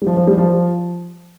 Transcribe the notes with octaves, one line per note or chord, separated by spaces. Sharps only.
G3
F3
F3
G3
F3